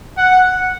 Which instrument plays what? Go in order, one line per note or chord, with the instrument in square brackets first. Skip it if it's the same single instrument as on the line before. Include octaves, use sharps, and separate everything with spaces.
[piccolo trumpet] F#5